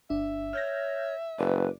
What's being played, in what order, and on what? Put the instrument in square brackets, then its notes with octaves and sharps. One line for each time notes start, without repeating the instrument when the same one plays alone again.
[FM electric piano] G1 D4 [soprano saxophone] E5
[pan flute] C#5 [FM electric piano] F6 G6 A#6
[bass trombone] F#1 [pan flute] B4 [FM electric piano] D5